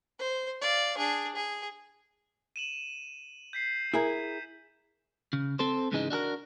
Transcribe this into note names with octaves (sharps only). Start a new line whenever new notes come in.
C5
D5 F5
D4 G#4
G#4
D#7 E7 F#7
G6 B6 C7
E4 G#4 A#4
C#3
C4 A4 C5
G#2 C#3 E3 G#3 C#4 D#4
D4 F#4 A4 A#4